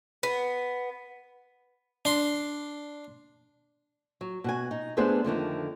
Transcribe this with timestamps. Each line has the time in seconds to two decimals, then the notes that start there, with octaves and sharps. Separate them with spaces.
0.23 B3
2.05 D4 C6
4.21 F#3
4.44 B2 F#4 G#5
4.71 D#4
4.97 A3 B3 D4 G#4 C5 F#5
5.24 F2 D3 D#3 A3